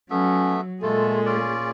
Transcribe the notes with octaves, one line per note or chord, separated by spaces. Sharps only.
F#3 A3 B3 C#4 E5
A#2 G#3 A3 F4 G#4 A4
C#4 F4 D5